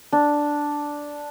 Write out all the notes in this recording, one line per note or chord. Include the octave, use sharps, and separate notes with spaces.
D4